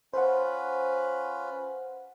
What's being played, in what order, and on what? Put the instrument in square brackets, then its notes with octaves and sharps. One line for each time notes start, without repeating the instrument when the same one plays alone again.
[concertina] C#4 F4 B4 [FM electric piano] C5 F#5